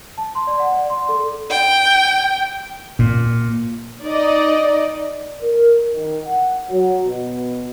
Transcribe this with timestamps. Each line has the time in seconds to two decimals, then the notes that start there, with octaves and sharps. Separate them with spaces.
0.18 A5
0.35 C6
0.47 D5
0.60 F#5
0.74 D5
0.90 C6
1.09 A4
1.51 G5
2.99 A#2
4.03 D#4 D5 D#5
5.41 A#4
5.93 D#3
6.25 F#5
6.69 F#3
7.05 B2